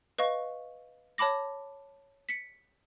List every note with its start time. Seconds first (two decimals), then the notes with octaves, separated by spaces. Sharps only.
0.18 B4 D#5 F5 C#6
1.18 C#5 A5 B5 D6 A#6
2.29 B6 C#7